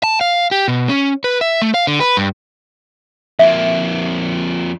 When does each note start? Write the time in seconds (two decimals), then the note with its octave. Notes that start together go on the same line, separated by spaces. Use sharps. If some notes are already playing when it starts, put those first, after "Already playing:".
0.03 A5
0.21 F5
0.51 G4
0.68 B2
0.89 C#4
1.24 B4
1.41 E5
1.62 A3
1.74 F5
1.87 D3
2.00 B4
2.17 G2
3.39 F2 A#3 E5